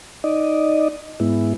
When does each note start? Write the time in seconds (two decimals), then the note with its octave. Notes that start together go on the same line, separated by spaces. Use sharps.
0.24 D#4 D5 D#5
1.20 G#2 G#3 B3 E4